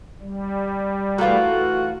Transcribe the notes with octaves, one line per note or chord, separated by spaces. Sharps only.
G3
E3 A3 F4 F#4 A#4